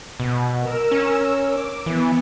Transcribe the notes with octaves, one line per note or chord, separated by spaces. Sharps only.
B2
A#4 E6
C#4
D6
E3 B3